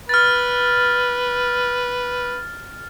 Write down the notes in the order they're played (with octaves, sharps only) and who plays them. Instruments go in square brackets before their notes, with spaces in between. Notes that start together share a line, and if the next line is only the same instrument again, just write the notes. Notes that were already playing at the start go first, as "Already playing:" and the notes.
[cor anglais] B4 [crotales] F6 A6